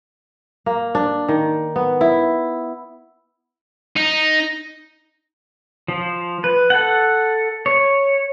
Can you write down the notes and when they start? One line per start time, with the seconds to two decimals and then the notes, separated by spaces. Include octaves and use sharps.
0.66 A#3
0.95 D4
1.28 D#3
1.76 B3
2.01 E4
3.96 D#4
5.88 F3
6.44 B4
6.70 A4 F#5
7.66 C#5